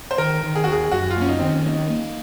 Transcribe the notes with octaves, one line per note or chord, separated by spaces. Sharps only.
C5
D#3 A#4
D#3
G#4
F#4
D#2 G#4
F#2 F#4
F4
A#3 C#4
D#4
D#3 C4
C#4
A#3 D#4
A#3